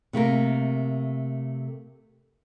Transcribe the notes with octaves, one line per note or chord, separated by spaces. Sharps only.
C3 A3 A#3 A#4